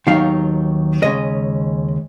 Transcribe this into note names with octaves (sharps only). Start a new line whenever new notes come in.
D#2 D#3 F#3 B3 D#4 F5
D#2 C#3 G#3 C#4 D#5